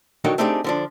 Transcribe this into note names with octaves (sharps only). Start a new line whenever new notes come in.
D3 D#3 F#3 D#4 A#4 C#5
A3 C4 D4 D#4 G4 G#4
D3 F3 D4